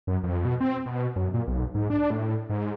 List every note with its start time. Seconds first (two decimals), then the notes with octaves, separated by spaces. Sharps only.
0.07 F#2
0.23 F2
0.45 B2
0.60 C4
0.86 B2
1.16 F#2
1.34 A#2
1.47 B1
1.75 G#2
1.90 D4
2.10 A2
2.49 G#2